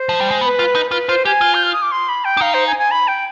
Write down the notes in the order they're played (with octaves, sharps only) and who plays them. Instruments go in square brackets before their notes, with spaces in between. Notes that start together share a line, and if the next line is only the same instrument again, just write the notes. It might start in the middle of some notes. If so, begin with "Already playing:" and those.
Already playing: [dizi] C5
[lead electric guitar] F3
G3
G#3
[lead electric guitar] B3 [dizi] C5
[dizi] B4
[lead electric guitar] F4
D#4
[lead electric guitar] F4 [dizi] B4
[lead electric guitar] F4 [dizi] C5
[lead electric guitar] G4 [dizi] G#5
[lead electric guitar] F4
[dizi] G6
F6
D#6
D6
C6
B5
G5
[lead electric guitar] D4
[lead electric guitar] D#4 [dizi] F5
[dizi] C5
G#5
G#5
B5
G5